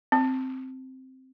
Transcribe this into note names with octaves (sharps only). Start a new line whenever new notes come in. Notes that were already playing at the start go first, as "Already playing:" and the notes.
C4